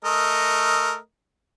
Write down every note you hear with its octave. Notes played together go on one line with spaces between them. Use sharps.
A3 A#4 D#5